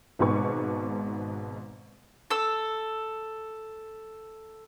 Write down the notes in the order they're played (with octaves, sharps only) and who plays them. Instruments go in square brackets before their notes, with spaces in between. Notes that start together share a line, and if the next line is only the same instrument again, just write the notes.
[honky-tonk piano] G#1 G#2 B2 B4 C#6 D6
[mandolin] A4 E6